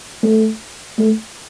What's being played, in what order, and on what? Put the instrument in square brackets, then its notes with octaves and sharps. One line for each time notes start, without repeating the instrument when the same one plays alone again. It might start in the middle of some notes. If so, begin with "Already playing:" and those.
[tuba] A3
A3